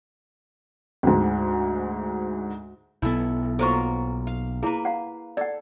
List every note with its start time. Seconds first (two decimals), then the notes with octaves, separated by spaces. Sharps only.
1.03 D2 G#2
3.02 B1 B3 E4 A4
3.59 F#3 A#3 F4 A4 C5 C#6
4.27 F5
4.63 A#3 E4 G#4 B4
4.85 F5 F#5
5.37 A4 D5 F#5